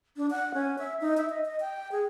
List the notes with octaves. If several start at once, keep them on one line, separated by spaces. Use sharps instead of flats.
D4
F#5
C#4
E5
D#4
E5
D#5
D#5
G5
G#4